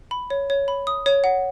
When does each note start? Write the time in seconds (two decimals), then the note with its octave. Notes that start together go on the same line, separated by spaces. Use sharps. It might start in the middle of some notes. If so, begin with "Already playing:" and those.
0.11 B5
0.30 C#5
0.50 C#5
0.68 B5
0.87 D#6
1.06 C#5
1.24 F#5